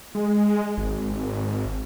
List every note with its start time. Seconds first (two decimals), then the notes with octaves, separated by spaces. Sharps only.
0.15 G#3
0.77 G#1